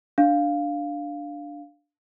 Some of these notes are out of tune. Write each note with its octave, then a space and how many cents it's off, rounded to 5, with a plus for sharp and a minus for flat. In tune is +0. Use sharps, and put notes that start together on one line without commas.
D4 +0 F5 +0